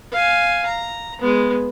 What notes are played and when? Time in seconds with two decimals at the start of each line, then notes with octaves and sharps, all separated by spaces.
0.12 F5 G#5
0.66 A#5
1.21 G#3 B3